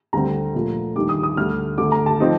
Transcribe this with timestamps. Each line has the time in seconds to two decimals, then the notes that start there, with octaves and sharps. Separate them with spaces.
0.13 D2 D3 G3 C4 A#5
0.55 A#2 F3 A3
0.96 D#2 D#3 G3 D4 D6
1.09 D#6
1.23 D#6
1.37 D2 D3 G3 F6
1.78 D2 D3 A3 D6
1.92 A#5
2.06 A5
2.20 F3 C4 D#4